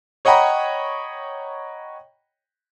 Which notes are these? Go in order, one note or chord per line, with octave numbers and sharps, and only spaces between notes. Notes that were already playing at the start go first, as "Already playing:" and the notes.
C#5 D#5 F#5 G5 A#5 B5